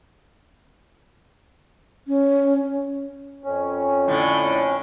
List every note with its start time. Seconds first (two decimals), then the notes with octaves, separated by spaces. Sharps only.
2.07 C#4
3.44 F2 C#4
4.08 A2 D3